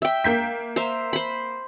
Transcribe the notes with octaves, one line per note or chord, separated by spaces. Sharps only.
E5 G5
A#3 G6 B6
C5 E5 A#5
C5 B5